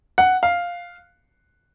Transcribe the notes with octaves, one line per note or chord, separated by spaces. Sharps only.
F#5
F5